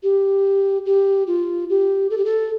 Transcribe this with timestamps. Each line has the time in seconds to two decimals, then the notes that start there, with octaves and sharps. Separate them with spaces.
0.03 G4
0.86 G4
1.27 F4
1.70 G4
2.10 A4
2.18 G4
2.25 A4